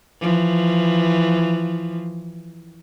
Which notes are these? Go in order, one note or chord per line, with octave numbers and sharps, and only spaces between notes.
E3 F3